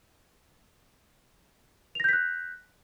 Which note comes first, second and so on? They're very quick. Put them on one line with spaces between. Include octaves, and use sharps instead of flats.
F7 A#6 G6 B6 F#6